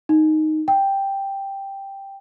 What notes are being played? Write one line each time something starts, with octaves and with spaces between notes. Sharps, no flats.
D#4
G5